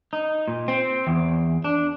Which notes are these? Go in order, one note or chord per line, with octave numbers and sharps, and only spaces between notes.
D#4
A#2
C4
E2
D4